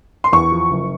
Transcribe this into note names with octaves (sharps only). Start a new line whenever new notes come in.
C6
E2 C#6
F3
F#1